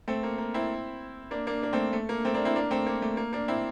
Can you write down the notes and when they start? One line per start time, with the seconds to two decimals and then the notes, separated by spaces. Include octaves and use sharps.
0.08 A3 C4
0.23 A#3
0.38 A#3
0.54 C4 E4
1.31 A#3 D4
1.47 A#3 D4
1.62 A#3 D4
1.73 A3 C4
1.93 A3
2.09 A#3
2.25 A3 C4
2.34 A#3 D4
2.45 C4 E4
2.56 A#3 D4
2.71 A3 C4
2.87 A#3
3.02 A3
3.17 A#3
3.33 A#3 D4
3.48 C4 E4